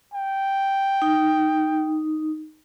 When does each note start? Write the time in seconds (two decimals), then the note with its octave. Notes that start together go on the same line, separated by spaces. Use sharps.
0.13 G5
1.02 D#4